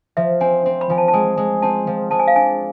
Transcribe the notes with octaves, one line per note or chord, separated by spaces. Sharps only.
F3 E5
C4 G#5
C4
B5
F3 G#5
A5
A5
G#3 G#5
G#3
C4 A5
F3
G#3 A5
G#5
F5
D4 G#5